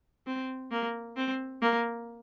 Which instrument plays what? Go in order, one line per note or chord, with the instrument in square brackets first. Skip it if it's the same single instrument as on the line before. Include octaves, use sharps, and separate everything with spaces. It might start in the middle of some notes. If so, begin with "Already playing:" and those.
[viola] C4
A#3
C4
A#3